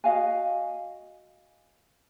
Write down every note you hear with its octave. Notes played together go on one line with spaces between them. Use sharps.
F#4 D#5 F5 G#5